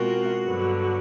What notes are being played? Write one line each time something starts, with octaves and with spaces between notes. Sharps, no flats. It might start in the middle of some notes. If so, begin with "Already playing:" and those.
Already playing: B2 G#3 C4 F4 F#4 A#4
G2 D3 F#3 B3